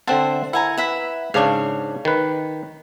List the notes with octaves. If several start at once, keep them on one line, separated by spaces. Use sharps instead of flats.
D3 C4 C5 E5 F#5 A5
E4 F#5 G#5 A#5
B4 E5 F#5
G#2 C#3 D4 F5 C#6
D#3 B4